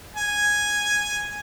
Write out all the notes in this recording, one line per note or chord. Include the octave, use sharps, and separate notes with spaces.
G#5